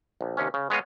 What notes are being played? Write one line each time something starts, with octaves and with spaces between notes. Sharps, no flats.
A#1
D#2 C3 C#4
C#3
G#3 B3 C#5 D#5 F5